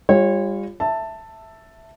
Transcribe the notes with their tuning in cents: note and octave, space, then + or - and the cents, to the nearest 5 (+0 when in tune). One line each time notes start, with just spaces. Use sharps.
G3 +30 F4 +0 C#5 -25
E5 +0 A5 +10